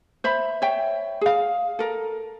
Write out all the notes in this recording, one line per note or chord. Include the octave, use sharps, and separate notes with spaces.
C5 E5 B5
C#5 E5 G5
G#4 F5
A4 A#4